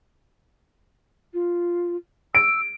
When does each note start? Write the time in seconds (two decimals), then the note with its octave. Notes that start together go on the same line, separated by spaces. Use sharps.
1.34 F4
2.35 E6 D7